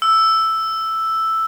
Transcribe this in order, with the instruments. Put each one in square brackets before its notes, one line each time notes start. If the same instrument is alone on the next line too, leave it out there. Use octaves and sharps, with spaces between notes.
[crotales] E6